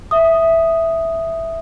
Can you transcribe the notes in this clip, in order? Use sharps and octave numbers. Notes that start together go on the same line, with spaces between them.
E5 D#6